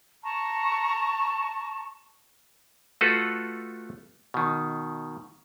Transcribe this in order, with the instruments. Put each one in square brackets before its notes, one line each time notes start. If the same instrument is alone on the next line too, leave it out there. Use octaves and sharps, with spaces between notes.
[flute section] A5 A#5 C#6
[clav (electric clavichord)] A3 F4 F#4 A4 B4
B2 D#3